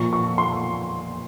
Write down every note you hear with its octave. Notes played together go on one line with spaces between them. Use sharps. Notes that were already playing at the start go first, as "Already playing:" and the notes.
Already playing: A#2 F3 C#6
C#6
C6